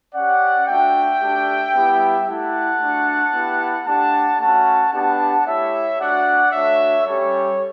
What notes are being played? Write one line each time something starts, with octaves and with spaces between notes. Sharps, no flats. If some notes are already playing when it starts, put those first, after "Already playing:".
C#4 G4 D5 F#5
A3 D4 F#4 E5 G5
A3 D4 G4
G3 B3 E4 G4
A3 E4 G4 F#5 A5
A3 D4 F#4
B3 E4 G4
A3 D4 G4 F#5 A5
A3 C#4 F#4 F#5 A5
B3 D4 G4 F#5 A5
A3 E4 G4 C#5 E5
A3 D4 F#4 D5 F#5
A3 D4 F#4 C#5 E5
G3 C#4 G4 A4 C#5